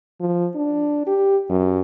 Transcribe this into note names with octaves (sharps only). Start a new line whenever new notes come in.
F3
D4
G4
F#2